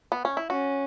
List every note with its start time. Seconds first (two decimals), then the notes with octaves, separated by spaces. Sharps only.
0.12 B3
0.25 C#4
0.37 E4
0.50 C#4 F#4